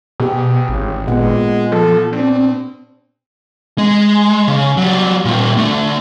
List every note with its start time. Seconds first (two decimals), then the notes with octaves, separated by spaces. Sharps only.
0.20 B2 G4 G#4
0.69 G#1 C#3
1.08 A#2 G#3 B3 F#5
1.72 F3 A4
2.13 C4 D4
3.78 G#3
4.48 C#3
4.77 F#3 G3
5.25 A#2 G3
5.57 D2 A3